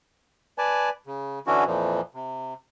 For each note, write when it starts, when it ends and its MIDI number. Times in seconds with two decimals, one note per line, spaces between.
0.58 0.89 71
0.58 0.89 74
0.58 0.89 80
0.58 0.89 81
1.07 1.39 49
1.47 1.64 50
1.47 1.64 52
1.47 1.64 61
1.47 1.64 62
1.47 1.64 64
1.47 1.64 66
1.66 2.01 41
1.66 2.01 46
1.66 2.01 52
1.66 2.01 53
2.14 2.54 48